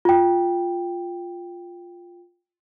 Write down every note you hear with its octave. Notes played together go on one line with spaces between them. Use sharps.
F4 G5